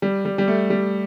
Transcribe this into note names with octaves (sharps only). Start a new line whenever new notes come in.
G3
G3
G3
A3
G3